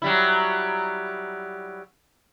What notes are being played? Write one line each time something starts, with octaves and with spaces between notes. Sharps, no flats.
F#3 G3 E4